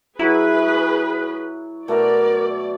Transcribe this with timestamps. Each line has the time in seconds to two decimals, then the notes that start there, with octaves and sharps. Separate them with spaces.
0.19 F#3 E4 G#4 B4
1.88 B2 A3 A#4 D5